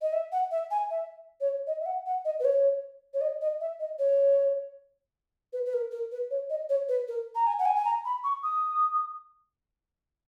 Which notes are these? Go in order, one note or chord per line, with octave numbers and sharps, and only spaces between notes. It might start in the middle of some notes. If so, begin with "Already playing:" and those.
D#5
E5
F#5
E5
G#5
E5
C#5
D#5
E5
F#5
F#5
D#5
B4
C#5
C#5
D#5
D#5
E5
D#5
C#5
B4
B4
A#4
A#4
B4
C#5
D#5
C#5
B4
A#4
A#5
G#5
F#5
G#5
G#5
A#5
B5
C#6
D#6